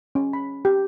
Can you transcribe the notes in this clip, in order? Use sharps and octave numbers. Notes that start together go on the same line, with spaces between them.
C#4
B5
G4